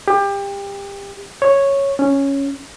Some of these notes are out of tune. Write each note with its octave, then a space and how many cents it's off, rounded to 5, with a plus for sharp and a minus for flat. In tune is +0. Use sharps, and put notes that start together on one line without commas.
G4 +25
C#5 -5
C#4 +0